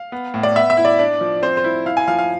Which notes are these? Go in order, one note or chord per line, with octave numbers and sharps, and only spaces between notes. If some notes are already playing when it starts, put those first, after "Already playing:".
Already playing: F5
B3
A2
D5
B3 E5
E5
E4
D5
D4
F3
C4 C5
C5
E4
E4 F5
G#5
F3 F5
F5